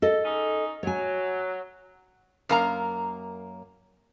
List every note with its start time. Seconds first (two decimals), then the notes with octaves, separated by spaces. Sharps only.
0.02 A4 D#5
0.23 C#4 D#4
0.83 F#3 C#5 G#5
2.49 F#2 A#3 A#5